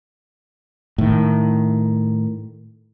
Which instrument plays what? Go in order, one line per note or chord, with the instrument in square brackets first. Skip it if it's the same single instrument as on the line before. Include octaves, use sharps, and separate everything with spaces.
[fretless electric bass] A2 D#3